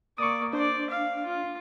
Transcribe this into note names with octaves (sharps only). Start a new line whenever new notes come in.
A#3 D5 C#6 D#6
D4 C5 D5
F5
F4